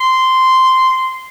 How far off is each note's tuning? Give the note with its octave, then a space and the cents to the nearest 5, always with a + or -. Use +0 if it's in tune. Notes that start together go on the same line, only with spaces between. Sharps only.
C6 -10